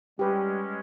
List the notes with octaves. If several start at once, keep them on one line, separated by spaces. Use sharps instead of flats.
G3 G#3 C#4 G4 B4